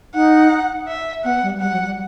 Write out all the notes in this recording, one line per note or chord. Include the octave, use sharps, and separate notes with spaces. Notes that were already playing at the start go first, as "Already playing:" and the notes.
D#4 F#5
E5
B3 F#5
G3
G3 F#5
F#3
G3